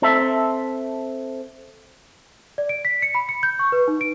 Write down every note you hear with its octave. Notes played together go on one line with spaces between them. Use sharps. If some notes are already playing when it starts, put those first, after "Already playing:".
C4 A4 E5
D5
D7
B6
C#7
B5
C#7
G6
C#6
B4
D#4
D7